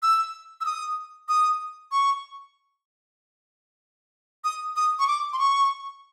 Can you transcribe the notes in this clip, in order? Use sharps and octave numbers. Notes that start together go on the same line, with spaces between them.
E6
E6
D#6
D#6
C#6
D#6
D#6
C#6
D6
C6
C#6